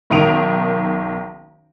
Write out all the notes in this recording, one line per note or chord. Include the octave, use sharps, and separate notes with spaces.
F#1 B1 D#3 D#6 D7 F7